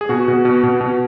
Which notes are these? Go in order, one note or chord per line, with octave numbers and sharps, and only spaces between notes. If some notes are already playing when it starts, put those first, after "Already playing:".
G#4
B2 F#4
B2
B2
B2
B2